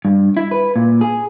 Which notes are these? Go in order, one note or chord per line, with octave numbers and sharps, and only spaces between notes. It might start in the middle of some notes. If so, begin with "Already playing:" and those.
G2
E4
B4
A#2
G#4